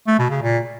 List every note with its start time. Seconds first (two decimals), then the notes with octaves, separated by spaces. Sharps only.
0.07 A3
0.19 B2
0.30 C#3
0.42 A#2